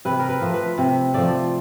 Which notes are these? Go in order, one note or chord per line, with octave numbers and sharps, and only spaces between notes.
C3 B4
A#4
B4
F3 A3
B4
C3
F3 A3 D5